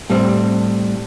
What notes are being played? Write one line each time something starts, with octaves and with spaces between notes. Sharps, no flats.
A2 G3 C4